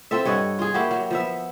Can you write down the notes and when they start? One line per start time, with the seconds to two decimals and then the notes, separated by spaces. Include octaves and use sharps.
0.11 C4 F4 A4 E5
0.25 G2 C#5 D#5 F#5
0.59 F4 G#4
0.74 A#3 E4 F#4 G4
0.91 F#3
1.11 F3 B3 E5